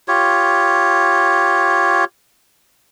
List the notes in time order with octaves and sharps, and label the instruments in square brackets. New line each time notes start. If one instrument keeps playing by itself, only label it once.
[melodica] F4 G4 C#5